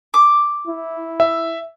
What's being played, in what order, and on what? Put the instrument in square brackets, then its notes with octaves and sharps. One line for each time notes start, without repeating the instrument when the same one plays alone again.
[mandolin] D6
[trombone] E4
[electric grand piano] E5